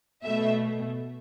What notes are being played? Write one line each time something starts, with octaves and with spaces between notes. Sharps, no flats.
B2 A3 E5